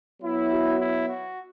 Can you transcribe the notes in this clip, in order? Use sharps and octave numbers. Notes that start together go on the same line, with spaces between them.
F#3 B3 E4
F#4
E4
F#4